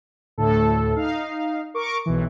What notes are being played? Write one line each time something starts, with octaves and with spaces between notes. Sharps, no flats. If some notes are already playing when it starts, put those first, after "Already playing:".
D2 A2 A4
D#4 F5
A#4 C#6 D6
B1 E3